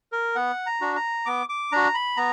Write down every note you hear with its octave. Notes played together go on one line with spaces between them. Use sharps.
A#4
B3 F#5
A#5
D4 F#4
A#5
B3 D6
D6
D4 F#4 A#5
B5
B3 A#5